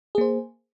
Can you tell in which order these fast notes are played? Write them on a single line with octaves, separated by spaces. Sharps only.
G#4 A#3 C5